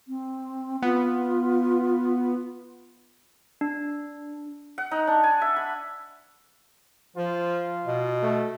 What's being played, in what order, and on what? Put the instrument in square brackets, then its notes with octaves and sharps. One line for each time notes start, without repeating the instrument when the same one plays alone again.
[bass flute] C4
[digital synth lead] B3 [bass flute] F4
[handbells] D4
[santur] F#5
D#4
D4
G#5
E5
B5
[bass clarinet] F3 [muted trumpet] F4
[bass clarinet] B2
[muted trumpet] A3